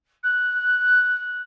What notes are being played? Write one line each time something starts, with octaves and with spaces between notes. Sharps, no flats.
F#6